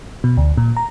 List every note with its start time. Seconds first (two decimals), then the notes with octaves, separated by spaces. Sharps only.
0.24 B2
0.37 D2
0.57 A#2
0.77 A#5